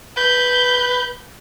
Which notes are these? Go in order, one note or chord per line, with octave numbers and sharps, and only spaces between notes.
B4 G6